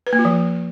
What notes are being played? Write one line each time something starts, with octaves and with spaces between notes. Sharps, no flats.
B4
A#3
F4
F3